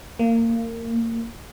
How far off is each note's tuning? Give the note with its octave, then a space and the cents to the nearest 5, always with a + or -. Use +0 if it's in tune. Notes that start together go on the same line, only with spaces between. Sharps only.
A#3 -25